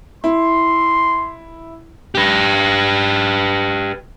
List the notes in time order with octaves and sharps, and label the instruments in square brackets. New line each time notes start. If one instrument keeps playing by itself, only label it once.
[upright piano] E4 [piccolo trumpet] C6
[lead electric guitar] G4 B4